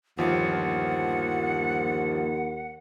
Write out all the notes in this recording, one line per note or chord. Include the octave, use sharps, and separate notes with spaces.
G1 D#2 F3 F4 F#5